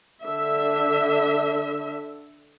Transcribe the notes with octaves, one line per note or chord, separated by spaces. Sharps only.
D3 D4 E5